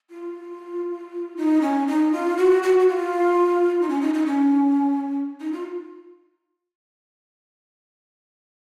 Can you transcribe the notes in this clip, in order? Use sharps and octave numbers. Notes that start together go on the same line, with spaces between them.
F4
D#4
C#4
D#4
F4
F#4
F#4
F#4
F4
D#4
C#4
D#4
D#4
C#4
D#4
F4